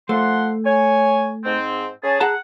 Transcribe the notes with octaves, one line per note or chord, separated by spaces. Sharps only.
F3 A3 F#5 C6
C#5 G#5
G#2 C4
C#4 G#4 A5
G#4 F#5 A5 A#5